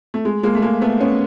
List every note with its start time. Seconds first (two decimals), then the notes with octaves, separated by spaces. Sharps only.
0.14 A3
0.25 G#3
0.43 G#3 A#3
0.55 A3
0.62 G#3 A#3
0.81 A3 B3
1.00 B3 C#4